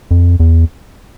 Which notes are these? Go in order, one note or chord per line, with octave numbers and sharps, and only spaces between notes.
F2
E2